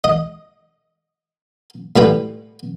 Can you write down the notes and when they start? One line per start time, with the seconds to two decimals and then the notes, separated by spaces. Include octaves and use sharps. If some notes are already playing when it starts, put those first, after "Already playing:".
0.04 D#5
1.96 A2 G3 B4 G5